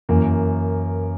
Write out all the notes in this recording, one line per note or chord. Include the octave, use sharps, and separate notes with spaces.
F#2 E3 A#3